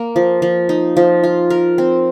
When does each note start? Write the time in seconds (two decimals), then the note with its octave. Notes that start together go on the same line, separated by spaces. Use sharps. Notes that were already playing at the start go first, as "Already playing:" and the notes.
Already playing: A#3
0.16 F3
0.42 F3
0.69 D#4
0.97 F3
1.24 F4
1.50 A#4
1.78 C4